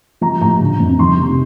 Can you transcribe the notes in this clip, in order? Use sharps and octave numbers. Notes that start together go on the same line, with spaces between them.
F3 A#5
A2 A#5
D3
F2
D#3 C6
C3